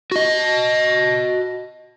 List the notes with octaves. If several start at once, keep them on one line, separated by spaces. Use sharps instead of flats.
F#4 D#5